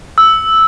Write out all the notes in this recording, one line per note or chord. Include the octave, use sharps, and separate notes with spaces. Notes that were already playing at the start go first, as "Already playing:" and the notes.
E6